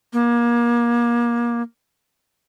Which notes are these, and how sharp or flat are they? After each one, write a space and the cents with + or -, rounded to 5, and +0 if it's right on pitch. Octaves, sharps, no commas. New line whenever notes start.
A#3 +30